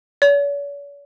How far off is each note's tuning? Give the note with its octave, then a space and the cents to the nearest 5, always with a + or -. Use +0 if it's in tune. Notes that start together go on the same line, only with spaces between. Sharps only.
C#5 +45